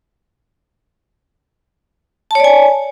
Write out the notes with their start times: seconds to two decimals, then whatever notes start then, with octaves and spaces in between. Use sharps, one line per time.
2.31 A5
2.35 C#5
2.40 D5
2.44 G#5